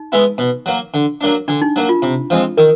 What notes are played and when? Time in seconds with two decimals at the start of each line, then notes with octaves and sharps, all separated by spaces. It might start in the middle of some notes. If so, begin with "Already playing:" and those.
Already playing: D#4
0.12 G#3 B3 E4
0.38 B2
0.66 F#3 A#3
0.94 D3
1.21 F#3 A#3 D4
1.48 D3 D4
1.62 D#4
1.76 F#3 A#3
1.89 F4
2.02 C3
2.30 F3 G#3 C4
2.57 D#3 A#4